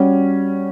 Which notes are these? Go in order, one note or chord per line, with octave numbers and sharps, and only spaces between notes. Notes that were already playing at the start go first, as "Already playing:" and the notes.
Already playing: G3 C#4 F#4